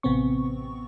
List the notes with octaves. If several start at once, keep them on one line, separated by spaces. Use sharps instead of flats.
A1 C3 B3 C4 C#6